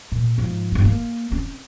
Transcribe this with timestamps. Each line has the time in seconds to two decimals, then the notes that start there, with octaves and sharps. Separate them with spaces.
0.12 A#2
0.38 G#2 F3
0.72 G1 G2
0.85 A#3
1.32 C4 C#4